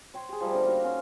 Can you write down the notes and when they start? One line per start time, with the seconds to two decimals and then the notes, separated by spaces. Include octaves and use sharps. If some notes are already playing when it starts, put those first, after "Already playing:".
0.14 C#5 G5 C6
0.29 G4 G#4
0.40 F3 G3 A3
0.53 D3 B3 A#4
0.66 A#3 D#4 F#4 F5
0.84 A#3 C#4 C5 D#5